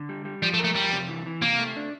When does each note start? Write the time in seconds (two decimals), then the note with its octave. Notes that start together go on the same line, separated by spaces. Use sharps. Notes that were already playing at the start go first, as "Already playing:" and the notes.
Already playing: D3
0.09 G3
0.25 G3
0.43 F3 G3
0.54 A3
0.59 A#4
0.65 A3
0.76 F2 G3
0.93 C3
1.09 E3
1.26 E3
1.42 C3 A#3
1.59 A3
1.77 D4